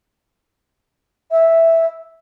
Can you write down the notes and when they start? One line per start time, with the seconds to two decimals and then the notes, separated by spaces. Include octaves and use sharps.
1.31 E5